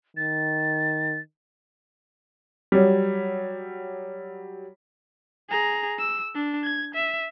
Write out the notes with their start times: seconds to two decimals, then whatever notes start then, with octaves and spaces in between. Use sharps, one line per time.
0.17 D#3 A6
2.72 F#3 G3
5.49 G#4 A#5
5.99 E6
6.35 D4
6.64 G#6
6.94 E5